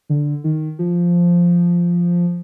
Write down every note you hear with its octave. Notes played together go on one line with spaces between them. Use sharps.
D3
D#3
F3